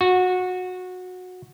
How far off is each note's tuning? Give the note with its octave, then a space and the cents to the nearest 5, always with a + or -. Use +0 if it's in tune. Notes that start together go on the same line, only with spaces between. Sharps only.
F#4 -20